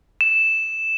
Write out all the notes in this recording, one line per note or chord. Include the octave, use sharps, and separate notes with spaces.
E7